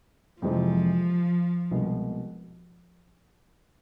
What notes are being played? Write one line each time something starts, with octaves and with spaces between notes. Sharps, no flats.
F2 C3 E3 F3 G#3 C4
C2 B2 G#3